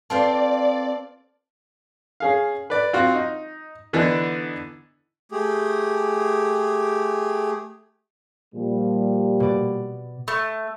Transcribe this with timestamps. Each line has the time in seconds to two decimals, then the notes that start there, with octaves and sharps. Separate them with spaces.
0.10 C4 F4 A4 B4 C5 D5 A5
2.20 C#4 G#4 F5
2.70 B4 D5
2.93 C4 F4 F#4
3.14 D#4
3.93 D3 E3 B3 D4 D#4
5.32 A3 G4 G#4
8.54 A#2 F3 G3
9.40 B2 D5
10.28 A3